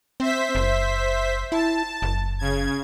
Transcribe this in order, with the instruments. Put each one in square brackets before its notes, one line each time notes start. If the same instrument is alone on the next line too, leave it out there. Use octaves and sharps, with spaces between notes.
[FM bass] C4 [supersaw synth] C5 E5 B6
[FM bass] F#1
[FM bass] E4 [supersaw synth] A5
[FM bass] F#1
[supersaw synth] C#3 G#6